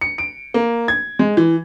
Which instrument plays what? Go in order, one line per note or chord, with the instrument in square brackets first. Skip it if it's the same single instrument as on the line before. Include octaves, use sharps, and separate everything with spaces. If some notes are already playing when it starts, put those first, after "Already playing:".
[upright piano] C#7
D7
A#3
G#6
G#3
E3